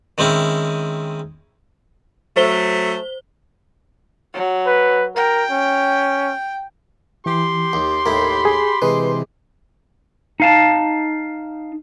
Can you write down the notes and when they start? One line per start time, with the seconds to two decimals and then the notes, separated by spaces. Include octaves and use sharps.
0.18 D#3 G#3 C4 C#4 E4
2.37 F#3 A3 C5 G7
4.34 F#3
4.67 B4
5.16 A#4 G5
5.51 C#4
7.26 E3 G4 C6
7.73 D#2
8.06 D#2 A2 E4 A#4 B5
8.45 G#4
8.82 C3 E3 G#3 B4
10.40 D#4 F5 A5